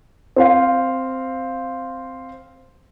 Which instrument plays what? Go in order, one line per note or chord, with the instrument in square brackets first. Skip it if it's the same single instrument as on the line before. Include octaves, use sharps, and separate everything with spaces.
[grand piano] C4 C5 F5